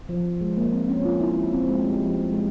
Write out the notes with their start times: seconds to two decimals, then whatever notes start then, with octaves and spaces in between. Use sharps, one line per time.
0.09 F3
0.41 G#3
0.57 A#3
0.73 C4
0.89 C#4
1.05 F4
1.21 E4
1.53 C4
1.69 G#3
1.85 G3
2.01 F3
2.17 G3
2.33 G#3